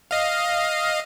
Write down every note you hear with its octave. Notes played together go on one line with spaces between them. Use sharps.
D#5 F5